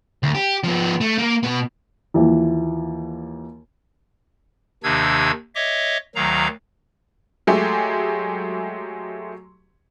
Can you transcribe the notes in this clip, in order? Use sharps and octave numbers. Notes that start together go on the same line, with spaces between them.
D2
G4
F3 B3
A3
A#3 A#4
B2 B3
D#2 E3 F3
D#2 C3 D#3 D4 E6 G#6
C#5 D#5 E5 D6
D2 D#3 F#3 F5 A#5
F#3 G#3 A3 G4 G#4